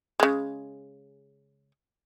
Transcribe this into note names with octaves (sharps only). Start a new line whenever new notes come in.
C#3 G#3